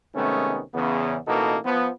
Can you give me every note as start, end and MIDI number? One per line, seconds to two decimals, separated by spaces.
0.15 0.62 48
0.15 0.62 51
0.15 0.62 56
0.15 0.62 57
0.15 0.62 59
0.15 0.62 61
0.74 1.18 40
0.74 1.18 49
0.74 1.18 59
1.27 1.58 33
1.27 1.58 47
1.27 1.58 52
1.27 1.58 58
1.27 1.58 63
1.27 1.58 69
1.65 1.90 53
1.65 1.90 59